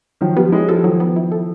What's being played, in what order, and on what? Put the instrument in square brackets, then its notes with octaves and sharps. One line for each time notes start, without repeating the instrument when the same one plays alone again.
[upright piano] D#3 F3 [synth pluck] F#3
[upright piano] F3 G3 [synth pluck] B3
[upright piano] F#3 G#3 [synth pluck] E4
[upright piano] F3 G3 [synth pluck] A4
[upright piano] D#3 F3 [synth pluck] F#3
[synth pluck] B3
E4
A4